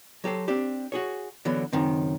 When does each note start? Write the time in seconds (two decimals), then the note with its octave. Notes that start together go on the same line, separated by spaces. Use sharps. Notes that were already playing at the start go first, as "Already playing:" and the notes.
0.24 F#3 G4 A4 C5
0.48 C4 D4 G4
0.92 F#4 G#4 C#5
1.45 D3 E3 F#3 B3
1.73 C#2 F#2 D#3 C4